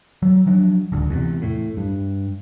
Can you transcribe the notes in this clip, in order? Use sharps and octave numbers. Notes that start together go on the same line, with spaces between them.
F#3
F3 F#3 D4
D1 C#2 D3
E2 C3
A2
G2